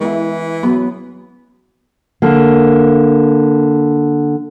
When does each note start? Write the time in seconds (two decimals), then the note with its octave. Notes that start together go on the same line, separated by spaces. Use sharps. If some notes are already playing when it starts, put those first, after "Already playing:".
0.01 E3 G#3 B3 E4
0.63 F#3 B3
2.22 D3 A#3